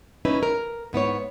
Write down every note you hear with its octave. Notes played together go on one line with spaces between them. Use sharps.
C#4 D#4 E4 B4
A#4
G#2 B3 E4 C#5